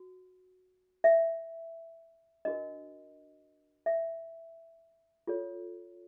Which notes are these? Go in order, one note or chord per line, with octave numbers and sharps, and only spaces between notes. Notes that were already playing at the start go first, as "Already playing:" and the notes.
Already playing: F#4
E5
D4 F#4 A#4 D#5
E5
F4 A4 C#5